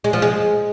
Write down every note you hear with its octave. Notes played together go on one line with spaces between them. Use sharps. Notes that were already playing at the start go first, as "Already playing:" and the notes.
G#3
F3
G#3